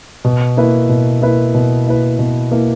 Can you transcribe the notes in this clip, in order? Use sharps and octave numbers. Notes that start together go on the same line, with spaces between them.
B2
A#3 E4 B4
B2
A#3 E4 B4
B2
A#3 E4 B4
B2
A#3 E4 B4